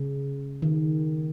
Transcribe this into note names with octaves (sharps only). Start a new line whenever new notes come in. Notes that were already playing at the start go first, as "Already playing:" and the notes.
Already playing: C#3
D#3